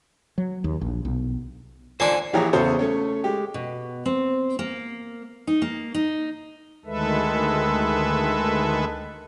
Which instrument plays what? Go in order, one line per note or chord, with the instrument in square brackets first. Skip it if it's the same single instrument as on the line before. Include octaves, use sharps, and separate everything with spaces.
[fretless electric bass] F#3
D#2
A#1
B1
[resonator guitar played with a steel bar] A#2 D3 D4 [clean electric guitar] C5 G#5 [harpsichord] D5 C6
[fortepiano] A#1 E3 G4 G#4 C#5 A#5
E2 C#3 C#4 A4 C5 C#5
A3 C#4 C#5
G#3 G4
[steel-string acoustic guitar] B2
C4
A#3
D#4
A#3
D#4
[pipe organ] D2 D#3 G#3 A4 B4 E5